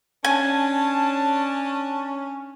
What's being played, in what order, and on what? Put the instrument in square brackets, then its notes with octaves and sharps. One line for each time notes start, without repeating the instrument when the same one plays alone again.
[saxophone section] C#4 [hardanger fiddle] D4 A5 [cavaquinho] G#5